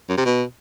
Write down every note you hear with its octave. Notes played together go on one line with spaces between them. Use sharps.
F#2
C3
B2